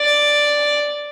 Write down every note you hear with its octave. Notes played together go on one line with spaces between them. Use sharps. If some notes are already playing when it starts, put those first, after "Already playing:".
Already playing: D5